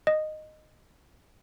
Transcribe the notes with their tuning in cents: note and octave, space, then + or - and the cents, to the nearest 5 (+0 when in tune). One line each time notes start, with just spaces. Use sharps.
D#5 -10